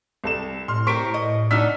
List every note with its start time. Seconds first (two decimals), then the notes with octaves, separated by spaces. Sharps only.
0.24 C2 A4 E7
0.68 A2 C6 F6
0.87 G4 A#4 C5 C#6 B6 D7
1.14 D#5
1.51 D4 D#4 F#4 E6 F6 B6